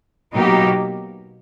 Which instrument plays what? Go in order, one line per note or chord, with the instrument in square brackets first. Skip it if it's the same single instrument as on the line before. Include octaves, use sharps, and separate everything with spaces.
[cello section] B2 F#3 A#3 D#4 G4